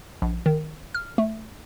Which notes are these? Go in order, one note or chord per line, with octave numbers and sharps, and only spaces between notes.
A#1
D#3
F6
A3